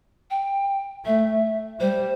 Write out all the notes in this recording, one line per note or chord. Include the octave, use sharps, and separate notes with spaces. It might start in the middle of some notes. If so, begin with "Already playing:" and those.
G5
A3 E5
G3 C5